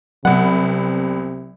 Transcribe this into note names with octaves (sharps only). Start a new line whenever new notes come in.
C2 C3 F#3 B3 F#5